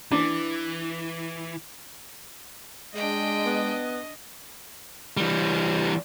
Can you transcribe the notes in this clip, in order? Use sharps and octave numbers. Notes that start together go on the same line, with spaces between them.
E3 D4
G#3 D4 D#5 G5
B3
E3 G3